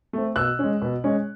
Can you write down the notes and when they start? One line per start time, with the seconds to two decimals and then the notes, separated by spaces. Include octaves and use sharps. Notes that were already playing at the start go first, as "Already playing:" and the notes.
0.13 A3 C4
0.36 B2 E6 F#6
0.59 G#3 C#4
0.82 B2
1.04 G#3 C#4